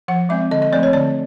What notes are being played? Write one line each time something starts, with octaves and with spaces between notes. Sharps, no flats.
F3 F#5
G#3 C4 E5
D3 D#5
D#5
F3 A3 C4 D5
C#5
D3 D5